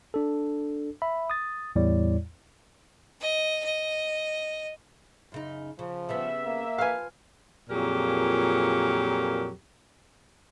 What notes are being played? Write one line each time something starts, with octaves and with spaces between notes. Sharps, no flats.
D4 A4
E5 B5
D#6 A6
E2 A2 G3 E4 C#5 D5
D#5
D#5
F#2 C#3 D#4
C#3 F3
C#3 G3 B3 E5
A#3
F3 B4 F5 G#5
F2 A#2 F#3 G4 G#4 A#4